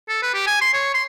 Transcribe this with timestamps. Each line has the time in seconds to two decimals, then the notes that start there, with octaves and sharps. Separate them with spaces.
0.09 A4
0.23 B4
0.34 G4
0.47 G#5
0.61 C6
0.73 C#5
0.94 C6